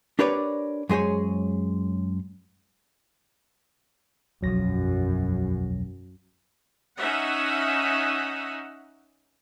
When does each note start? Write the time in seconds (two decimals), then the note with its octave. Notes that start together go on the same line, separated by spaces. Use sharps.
0.19 D4 G4 A#4 B4 C#5 D5
0.89 F#2 G#3 G#4 C5 C#5
4.43 E1 B1 F#2 F3 F#3 A#6
6.98 C#4 D#4 E5 F#5